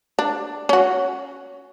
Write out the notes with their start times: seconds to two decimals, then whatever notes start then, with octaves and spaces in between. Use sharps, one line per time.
0.19 D4
0.69 C#4 F#4